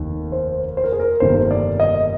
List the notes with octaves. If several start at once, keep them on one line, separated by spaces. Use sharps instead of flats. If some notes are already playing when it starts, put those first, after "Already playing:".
Already playing: F1 D#2 D#3
C5
C5
A#4
G#4
A#4
G1 F2 C3 D#3 A#3 C5
D5
D#5